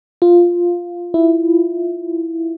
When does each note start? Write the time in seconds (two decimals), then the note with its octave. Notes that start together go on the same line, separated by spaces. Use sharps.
0.22 F4
1.14 E4